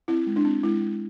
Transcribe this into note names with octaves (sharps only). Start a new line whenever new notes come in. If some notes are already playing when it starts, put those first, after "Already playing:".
C4 E4
G#3
D4
C4
G#3 E4
G#3